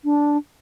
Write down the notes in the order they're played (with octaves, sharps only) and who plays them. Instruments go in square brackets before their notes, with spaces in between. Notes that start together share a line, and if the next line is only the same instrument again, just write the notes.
[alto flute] D4